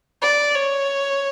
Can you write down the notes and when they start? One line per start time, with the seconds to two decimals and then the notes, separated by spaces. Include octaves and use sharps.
0.22 D5
0.55 C#5